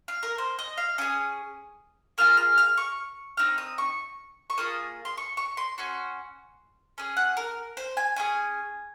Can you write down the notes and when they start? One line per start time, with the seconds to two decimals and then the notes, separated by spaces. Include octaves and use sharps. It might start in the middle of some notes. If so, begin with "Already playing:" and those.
0.08 F5
0.23 A#4
0.38 C5
0.59 D#5
0.77 F5
0.98 C#4 G#4 D#6
2.18 A#3 F4 G#4 F6
2.37 F6
2.58 F6
2.77 C#6
3.37 C4 D#4 F6
3.58 D#6
3.78 C#6
4.50 C#6
4.58 A#3 F4 G#4 D#6
5.05 C6
5.18 C#6
5.37 C#6
5.57 C6
5.78 C#4 F#4 C6
6.98 C#4 G#4
7.17 F#5
7.37 A#4
7.77 C5
7.97 G#5
8.16 C#4 G#4 G#5